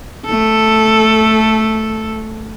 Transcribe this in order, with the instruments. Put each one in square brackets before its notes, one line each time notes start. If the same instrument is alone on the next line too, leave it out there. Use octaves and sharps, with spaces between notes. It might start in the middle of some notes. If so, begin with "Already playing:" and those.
[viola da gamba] A3 A4